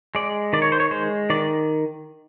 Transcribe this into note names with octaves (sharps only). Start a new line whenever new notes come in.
G#3 D5
D#3 D5
C#5
C5
C#5
G#3 C5
D#3 D5